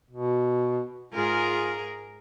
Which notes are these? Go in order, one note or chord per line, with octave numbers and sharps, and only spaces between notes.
B2
G#2 F4 G#4 A#4